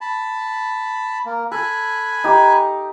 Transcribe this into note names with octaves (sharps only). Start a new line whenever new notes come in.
A5 B5
A#3
A4 G#5 B5 F#6
D#4 G4